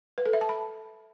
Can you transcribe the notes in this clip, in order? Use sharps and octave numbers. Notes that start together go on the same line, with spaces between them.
B4
A4
E5
A5
B5